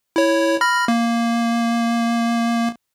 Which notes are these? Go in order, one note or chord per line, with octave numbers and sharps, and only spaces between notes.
E4 C#5
B5 F6 A#6
A#3